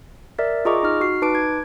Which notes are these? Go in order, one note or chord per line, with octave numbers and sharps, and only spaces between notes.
A#4 D5 E5
F4 G#4 D#5 A#5 C#6 D6
D#4 F6
F#4 C7
D#4 B4 A5 D6 D7
G#6